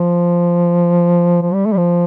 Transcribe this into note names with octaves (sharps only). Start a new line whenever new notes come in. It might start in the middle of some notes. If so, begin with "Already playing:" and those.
Already playing: F3
F3
G3
A3
G3
F3